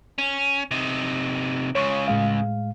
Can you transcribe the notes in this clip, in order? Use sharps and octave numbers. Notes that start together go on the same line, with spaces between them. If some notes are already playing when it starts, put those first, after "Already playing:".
C#4
C3 D#4
C#2 C#3 C#5 C#6
A2 G#3 F5